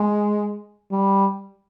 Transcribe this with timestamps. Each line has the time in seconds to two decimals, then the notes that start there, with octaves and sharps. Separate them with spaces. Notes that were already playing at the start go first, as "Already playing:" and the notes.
Already playing: G#3
0.91 G3